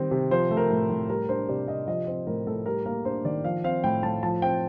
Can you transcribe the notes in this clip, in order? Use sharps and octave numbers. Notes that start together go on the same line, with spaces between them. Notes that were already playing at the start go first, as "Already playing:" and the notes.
Already playing: D#3 G3 C4
C3
F3 C5
A3
A#4
A2
A2
G3 A#4
D4 C5
C3 D5
C3 D#5
F3 D#5
C4 C5
A2 A#4
A2 A4
G3 A#4
A#3 A#4
D4 C5
D#3 D5
F3 F5
C4 F5
A2 G5
A2 A5
F3 A5
C4 G5